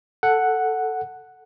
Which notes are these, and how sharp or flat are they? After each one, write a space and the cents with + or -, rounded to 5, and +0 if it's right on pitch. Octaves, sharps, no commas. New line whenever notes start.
A4 +5 F#5 +0